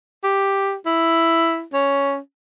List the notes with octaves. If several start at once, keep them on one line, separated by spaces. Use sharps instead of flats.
G4
E4
C#4